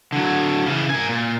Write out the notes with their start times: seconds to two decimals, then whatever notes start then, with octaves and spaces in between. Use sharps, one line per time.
0.13 D3 F#3
0.66 C#3 E3
0.90 A#4 G#5
1.09 A#2